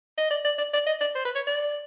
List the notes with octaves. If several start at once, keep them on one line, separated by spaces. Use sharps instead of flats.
D#5
D5
D5
D5
D5
D#5
D5
C5
B4
C#5
D5